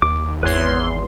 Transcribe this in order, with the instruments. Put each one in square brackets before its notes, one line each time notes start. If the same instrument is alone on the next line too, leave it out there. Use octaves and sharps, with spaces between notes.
[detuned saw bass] D#2 [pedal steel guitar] D6
[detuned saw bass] G#1 [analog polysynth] E2 C6 [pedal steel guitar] B4 C#5